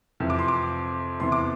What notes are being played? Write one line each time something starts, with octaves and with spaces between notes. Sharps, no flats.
F2 C3 E3
D6
C6
D6
E2 C3 E3 C6
D6